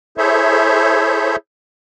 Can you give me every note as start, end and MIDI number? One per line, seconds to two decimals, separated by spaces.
0.18 1.36 64
0.18 1.36 68
0.18 1.36 69
0.18 1.36 72
0.18 1.36 73
0.18 1.36 76